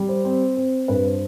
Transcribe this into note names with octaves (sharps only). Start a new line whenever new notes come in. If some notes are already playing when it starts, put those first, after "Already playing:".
Already playing: G3
C5
C4
C4
G2 B4
C5